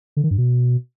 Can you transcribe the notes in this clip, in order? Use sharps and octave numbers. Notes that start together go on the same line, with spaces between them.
D3
D#3
G2
B2